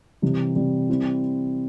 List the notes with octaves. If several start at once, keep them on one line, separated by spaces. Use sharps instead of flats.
C3 E3 G3 C4
C3 E3 G3 C4
G3 C4 E4